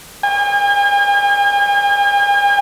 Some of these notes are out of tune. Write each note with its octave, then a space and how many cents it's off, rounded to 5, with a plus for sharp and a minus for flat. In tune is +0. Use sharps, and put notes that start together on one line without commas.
G#5 -45